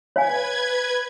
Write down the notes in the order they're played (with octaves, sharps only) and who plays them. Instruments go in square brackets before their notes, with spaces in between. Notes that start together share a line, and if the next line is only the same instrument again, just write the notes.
[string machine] B4 G#6 [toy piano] C#5 F5 G#5